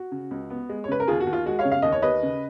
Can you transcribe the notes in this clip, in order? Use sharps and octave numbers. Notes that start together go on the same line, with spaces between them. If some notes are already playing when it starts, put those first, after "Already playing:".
Already playing: F#4
C#3
C#2
B3
G#3
C#5
C#3 B4
A#4
D#2 F4 G#4
F#4
D#2
F4
G#3 F#4
C#5 F5
C#3
F5
D#2 D#5
C#5
D#2 B4 D#5
C#3